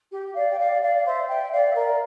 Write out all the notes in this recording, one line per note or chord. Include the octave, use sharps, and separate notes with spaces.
G4
D5 F5
G5
D5 F5
D5 F5
C5 E5
E5 G5
D5 F5
E5
A#4 D5